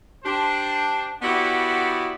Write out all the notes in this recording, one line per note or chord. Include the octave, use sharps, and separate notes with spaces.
D4 G4 C5
B3 E4 F#4 G4 C5 D5